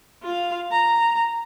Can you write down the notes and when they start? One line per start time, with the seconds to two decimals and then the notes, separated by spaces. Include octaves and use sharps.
0.23 F4 F5
0.71 A#5